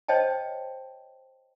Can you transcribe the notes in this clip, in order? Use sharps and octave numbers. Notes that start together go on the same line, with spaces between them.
C5 C#5 D#5 G5 A5